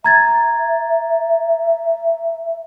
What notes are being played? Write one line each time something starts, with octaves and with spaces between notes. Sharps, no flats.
E5 A#5 G#6 A6